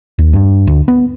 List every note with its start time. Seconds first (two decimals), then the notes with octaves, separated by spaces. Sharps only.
0.19 D#2
0.33 G2
0.67 D2
0.88 B3